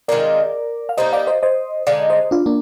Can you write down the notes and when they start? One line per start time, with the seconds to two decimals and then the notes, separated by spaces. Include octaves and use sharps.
0.08 D#3 G#3 C4 F4 A#4 D5
0.89 F5
0.97 G3 A#3 D#4 C5 D#5
1.13 D5 F5
1.27 C5 D#5
1.43 C5 D#5
1.87 D3 G#3 D#4 D5 F5
2.10 C5 D#5
2.31 D4 F4
2.46 A#3 D4